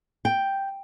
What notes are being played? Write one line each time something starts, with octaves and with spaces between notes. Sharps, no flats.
G5